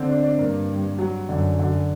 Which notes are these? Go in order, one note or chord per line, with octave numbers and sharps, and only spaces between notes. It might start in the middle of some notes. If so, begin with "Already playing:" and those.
Already playing: D3 C4
D4
D4
G2 A#3
F#3
F#2 D3
D3